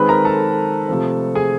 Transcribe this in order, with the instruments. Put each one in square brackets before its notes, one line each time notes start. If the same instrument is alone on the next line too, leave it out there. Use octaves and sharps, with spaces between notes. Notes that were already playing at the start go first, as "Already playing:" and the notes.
Already playing: [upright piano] D#3 G#3 C4 B4 B5
A#4 A#5
A4 A5
C3 F3 A3 C4
G#4 G#5